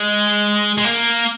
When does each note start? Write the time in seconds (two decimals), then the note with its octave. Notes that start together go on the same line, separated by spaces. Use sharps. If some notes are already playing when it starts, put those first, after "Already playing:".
Already playing: G#3
0.78 G#3
0.85 A#3